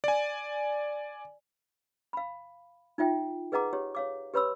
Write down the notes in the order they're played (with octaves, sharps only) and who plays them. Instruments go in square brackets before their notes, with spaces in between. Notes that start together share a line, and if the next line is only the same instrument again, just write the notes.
[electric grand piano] D5 G#5
[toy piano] F5 B5
D#4 F4 E5 G5
G#4 B4 D#5 F#5 A#5 D6
G4 C#5
C#5 F5 D6
G4 B4 C#5 B5 C6 E6